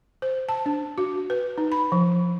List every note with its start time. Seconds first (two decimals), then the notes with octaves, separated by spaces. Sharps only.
0.22 C5
0.49 A5
0.66 D4
0.98 F#4
1.30 B4
1.58 D#4
1.72 B5
1.92 F3